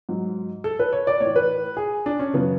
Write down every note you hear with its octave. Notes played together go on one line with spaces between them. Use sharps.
G#2 F#3
A4
B4
C#5
D5
A2 E3 C#5
B4
G#4
D4
C#4
F#2 C#3 E3 B3